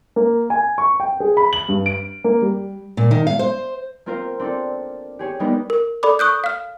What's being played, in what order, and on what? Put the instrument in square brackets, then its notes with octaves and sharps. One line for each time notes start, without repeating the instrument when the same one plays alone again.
[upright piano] A#3
G#5
C#6
G5
G#4
B5
F#7
G2
D7
A#3
G3
[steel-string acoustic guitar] A#2
D#3
F5
C5
[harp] A#3 C4 F4 A#4 C5 F5
C4 D4 F4 A4
G4 G#4 C#5
G3 G#3 A#3 B3 D4 D#4
[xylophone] A#4
A4 D5 B5 D6
C#6 D#6 F#6 G6
F5 F6